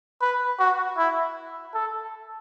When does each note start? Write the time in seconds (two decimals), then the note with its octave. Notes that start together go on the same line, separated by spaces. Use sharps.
0.21 B4
0.59 F#4
0.97 E4
1.74 A4